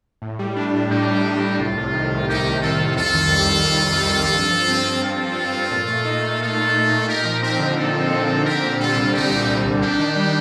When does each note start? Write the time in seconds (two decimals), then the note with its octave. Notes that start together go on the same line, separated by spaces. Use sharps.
0.22 A2
0.39 G3
0.56 D4
0.74 A2
0.90 A2 D#4 G4
1.08 G3
1.25 D4
1.42 A2
1.59 C2 F4
1.77 C3
1.94 D#3
2.11 C2
2.28 C2 D#4 G4
2.45 C3
2.62 D#3 F4 A4
2.79 C2
2.96 F2 F4 A4
3.14 D#3
3.31 G3
3.48 F2
3.65 F2
3.82 D#3
4.00 G3
4.17 F2
4.34 G2
4.51 F3
4.68 C4
4.85 G2
5.02 G2 F4 A4
5.20 F3
5.36 C4
5.53 G2
5.71 A#2
5.88 A3
6.05 D#4
6.22 A#2
6.39 A#2 F4 A4
6.56 A3
6.74 D#4
6.91 A#2
7.08 D#4 G4 A#4
7.25 F3
7.42 C4 G4 A#4
7.59 D3
7.76 D#4 F4 A4
7.94 F3
8.11 C4
8.29 D3
8.45 C4 G4 A#4
8.62 A#2
8.79 G3 F4 A4
8.96 C2
9.14 C4 D#4 G4
9.31 A#2
9.48 G3
9.65 C2
9.82 D4 D#4 G4
9.99 D#3
10.16 G3